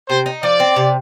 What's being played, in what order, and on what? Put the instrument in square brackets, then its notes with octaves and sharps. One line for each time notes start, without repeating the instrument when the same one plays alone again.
[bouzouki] C3 [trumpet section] C5
[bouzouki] D#4
[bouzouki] F3 [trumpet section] D5
[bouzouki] C4
C3